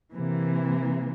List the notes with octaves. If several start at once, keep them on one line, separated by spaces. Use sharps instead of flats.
C3 E3 A#3